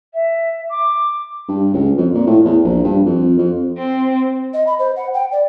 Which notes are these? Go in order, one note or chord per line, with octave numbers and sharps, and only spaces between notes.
E5
D6
G2
C#2
F2
A#2
A2
E2
A#1
G2
F2
F2
C4
D#5
B5
C5
F#5
G5
D5